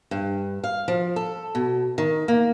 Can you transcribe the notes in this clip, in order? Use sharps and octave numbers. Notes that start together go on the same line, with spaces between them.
G2
F5
F3
A4
B2
D#3
A#3